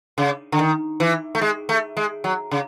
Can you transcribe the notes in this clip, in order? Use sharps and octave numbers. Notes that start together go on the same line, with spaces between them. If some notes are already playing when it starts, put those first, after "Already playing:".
C#3
D3
D#3
E3
A3
G#3
A3
G#3
F#3
C#3